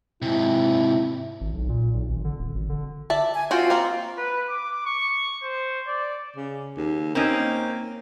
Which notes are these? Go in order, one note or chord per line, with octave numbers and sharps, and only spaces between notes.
G#2 C3 E4
G#1
B1
A#2
B1
G#1
D3
D#1
G#1
D3
D5 E5 A5
G#5
C4 F4 F#4 G5
A#3 C4
B4
D6
C#6
C5
D5
C#3
D#2
A#3 C4 C#4 D#4